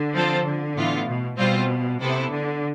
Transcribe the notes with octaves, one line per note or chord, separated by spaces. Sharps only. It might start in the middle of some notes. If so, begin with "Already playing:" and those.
Already playing: D3
F3 C4 F4 A4 C5
D3
A2 E3 B3 F4
B2
B2 G3 C4 F4 C5
C3 B3 E4 A4
D3